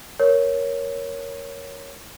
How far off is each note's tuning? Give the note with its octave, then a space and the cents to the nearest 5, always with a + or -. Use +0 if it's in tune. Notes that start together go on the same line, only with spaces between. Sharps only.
A#4 +10 C#5 +0